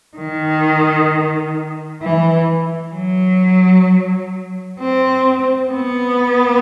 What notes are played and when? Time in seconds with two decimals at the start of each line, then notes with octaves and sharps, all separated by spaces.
0.17 D#3
2.02 E3
2.94 F#3
4.79 C4
5.72 B3